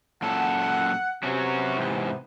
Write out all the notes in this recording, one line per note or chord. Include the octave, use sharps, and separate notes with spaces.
F#2 A#2 A4 F#5
C3 F#3 B3 C#4 F#4
E2 G#2